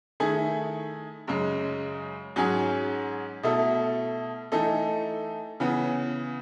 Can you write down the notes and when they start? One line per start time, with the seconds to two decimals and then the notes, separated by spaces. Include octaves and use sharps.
0.20 D#3 A3 E4 G#4
1.27 F#2 C#3 G#3
2.36 G#2 F#3 C#4 G#4
3.43 B2 A3 E4 A4
4.52 E3 A3 D#4 A4
5.60 C#3 E3 B3